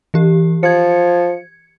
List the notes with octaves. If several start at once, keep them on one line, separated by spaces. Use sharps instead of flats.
E3 G4
F3 G#6 C#7